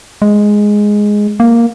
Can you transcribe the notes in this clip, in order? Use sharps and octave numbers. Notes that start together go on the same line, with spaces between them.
G#3
A#3